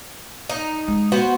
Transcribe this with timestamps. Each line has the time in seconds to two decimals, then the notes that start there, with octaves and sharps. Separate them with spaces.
0.50 D#4
0.88 G#3
1.12 B3 F#4 C5